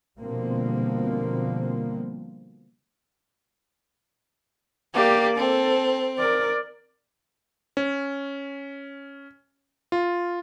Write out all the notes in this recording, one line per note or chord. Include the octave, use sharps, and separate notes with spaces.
B2 D3 F3 G3 A#3 C4
A#3 G4 D5
C4 A4
A#4 D5
C#4
F4